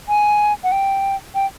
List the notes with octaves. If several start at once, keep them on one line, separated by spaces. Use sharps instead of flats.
G#5
F#5
G5
G5